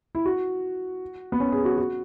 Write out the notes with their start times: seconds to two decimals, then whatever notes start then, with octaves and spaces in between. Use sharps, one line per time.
0.15 E4
0.26 F#4
1.32 B3
1.40 C#4
1.52 G#4
1.65 F#4
1.78 F#4